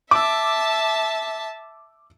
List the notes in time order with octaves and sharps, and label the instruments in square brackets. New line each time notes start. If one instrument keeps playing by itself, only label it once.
[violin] E5 A5 [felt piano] D6 E6